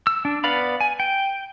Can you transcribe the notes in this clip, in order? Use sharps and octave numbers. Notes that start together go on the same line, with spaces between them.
E6
D4
B3 B4 D5 F5 B5
G#5
G5